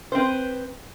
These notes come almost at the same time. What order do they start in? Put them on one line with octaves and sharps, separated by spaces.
C5 C4 B4